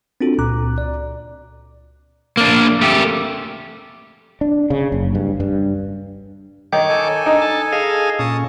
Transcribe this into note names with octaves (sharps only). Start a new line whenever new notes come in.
C4 D4 F4 F#4 A4
C#2 A#2 A#5 D6 F#6
D5
A#3 D4
A3 G4
D4
C#3
F#1
G2
G2
D#3 C#5 D6
A4 G#5
D4 D#4
A5
G#4 D#5 F5
A#2 C#4 A5 D#6